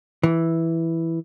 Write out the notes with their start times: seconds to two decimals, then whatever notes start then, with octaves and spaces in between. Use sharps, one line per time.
0.23 E3